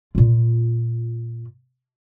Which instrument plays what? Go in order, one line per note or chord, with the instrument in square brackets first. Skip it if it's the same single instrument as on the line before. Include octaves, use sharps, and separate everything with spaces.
[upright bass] A#2 F4